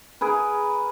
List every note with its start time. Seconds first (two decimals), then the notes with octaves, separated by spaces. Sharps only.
0.21 G#4 A#4 B4